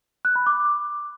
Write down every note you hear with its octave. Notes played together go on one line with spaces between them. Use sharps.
F#6
B5
D6